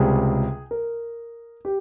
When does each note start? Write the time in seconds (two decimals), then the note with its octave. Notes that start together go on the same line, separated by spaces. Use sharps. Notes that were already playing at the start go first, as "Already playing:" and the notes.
Already playing: C#2 C3 G3 G#4
0.71 A#4
1.65 G4